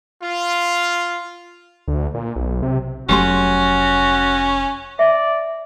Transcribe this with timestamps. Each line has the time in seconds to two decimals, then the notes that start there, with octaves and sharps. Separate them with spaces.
0.22 F4
1.88 D2
2.14 A#2
2.36 B1
2.62 C3
3.09 F1 F#3 A3 C#4 F#4 G4 C6
4.99 D5 E5